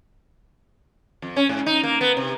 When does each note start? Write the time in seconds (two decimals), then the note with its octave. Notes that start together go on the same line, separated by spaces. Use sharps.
1.22 F2
1.36 C#4
1.49 G#2
1.66 D#4
1.83 A#3
2.01 B3
2.17 C3